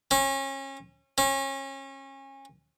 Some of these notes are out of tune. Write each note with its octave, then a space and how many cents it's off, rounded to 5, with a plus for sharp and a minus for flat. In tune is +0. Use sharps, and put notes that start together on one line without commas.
C#4 -30
C#4 -30